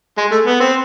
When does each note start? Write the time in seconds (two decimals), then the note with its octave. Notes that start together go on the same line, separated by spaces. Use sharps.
0.18 G#3
0.32 A3
0.46 B3
0.60 C4